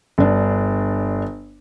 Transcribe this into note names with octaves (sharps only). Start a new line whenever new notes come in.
G1 D4